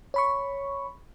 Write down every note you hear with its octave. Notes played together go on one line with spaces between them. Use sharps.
C#5 B5 C#6